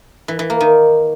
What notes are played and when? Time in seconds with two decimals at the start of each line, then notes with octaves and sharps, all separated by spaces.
0.28 E3
0.39 E3
0.50 A#3
0.60 D#3